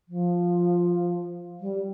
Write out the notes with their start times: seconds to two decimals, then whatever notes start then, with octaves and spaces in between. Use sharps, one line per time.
0.08 F3
1.60 G3